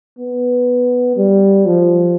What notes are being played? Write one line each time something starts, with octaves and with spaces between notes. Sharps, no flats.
B3
G3
F3